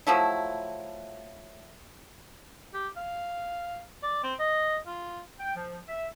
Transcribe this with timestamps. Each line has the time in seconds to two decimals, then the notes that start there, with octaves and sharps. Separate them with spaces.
0.07 F3 F#3 A3 E4
2.74 G4
2.97 F5
4.03 D5
4.23 C4
4.39 D#5
4.86 F4
5.39 G5
5.56 F3
5.89 E5